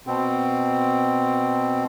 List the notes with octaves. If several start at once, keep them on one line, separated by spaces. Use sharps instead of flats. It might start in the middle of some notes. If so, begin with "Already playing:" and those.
B2 C4